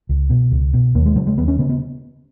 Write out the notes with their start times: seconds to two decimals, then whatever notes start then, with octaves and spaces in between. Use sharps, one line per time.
0.09 C#2
0.30 B2
0.52 C#2
0.73 B2
0.95 D#2 A#3
1.06 G#3
1.16 C#3 F#3
1.27 G#3
1.37 D#2 B3
1.48 C#4
1.59 C#3 B3
1.69 B3